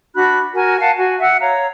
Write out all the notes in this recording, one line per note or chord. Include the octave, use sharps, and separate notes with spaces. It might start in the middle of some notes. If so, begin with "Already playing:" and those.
D4 F#4 B5 F#6
F#4 A#4 G#5
F5 F#5 A5
F#4 G#5
E5 F#5 E6
C#5 F5 A#5